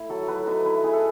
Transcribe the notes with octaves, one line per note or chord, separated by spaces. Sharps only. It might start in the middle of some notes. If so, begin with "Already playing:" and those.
Already playing: A3 E4
F#3 A4
F#3 B4
D#4 B4
E4 B4
E4 G#4
A4